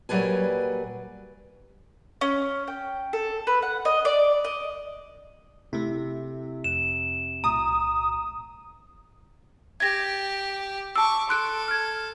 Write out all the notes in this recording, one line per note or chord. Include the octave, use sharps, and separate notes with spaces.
A#2 F#3 G3 B4 G#5
C#4
G5
A4
B4
F#5
D#5
D5
D#5
C3 A3 E4
F2 E7
B1 A2 A#5 D#6
G4 G#6 A#6
A5 C#6 D6 E6
A4 C6 F#6 D7
F6 G#6